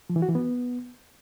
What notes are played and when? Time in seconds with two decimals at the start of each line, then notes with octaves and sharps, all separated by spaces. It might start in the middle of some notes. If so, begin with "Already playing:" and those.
0.10 F3
0.16 E3
0.22 F#4
0.29 E3
0.35 B3